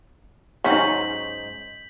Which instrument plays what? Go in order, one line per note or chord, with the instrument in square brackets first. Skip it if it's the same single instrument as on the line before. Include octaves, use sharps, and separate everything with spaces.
[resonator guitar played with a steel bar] G#2 D#4 [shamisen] F#3 C#4 [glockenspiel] G6 B6 F#7